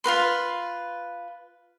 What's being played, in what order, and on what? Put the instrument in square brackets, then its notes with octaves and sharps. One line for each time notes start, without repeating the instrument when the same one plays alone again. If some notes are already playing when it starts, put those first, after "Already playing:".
[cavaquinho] F4 F#4 B4 C6